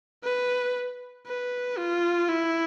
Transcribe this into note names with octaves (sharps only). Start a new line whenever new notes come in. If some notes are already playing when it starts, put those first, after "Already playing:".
B4
B4
F4
E4